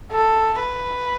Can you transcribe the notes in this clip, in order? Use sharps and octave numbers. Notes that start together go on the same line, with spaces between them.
A4
B4